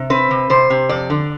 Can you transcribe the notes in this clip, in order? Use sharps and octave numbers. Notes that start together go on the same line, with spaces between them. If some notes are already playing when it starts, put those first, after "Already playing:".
Already playing: C3
C4 B4
C3
C3 C5
C3
F2 D5
D3